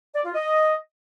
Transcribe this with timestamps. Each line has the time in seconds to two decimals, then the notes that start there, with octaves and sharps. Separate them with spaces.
0.15 D5
0.25 F4
0.34 D#5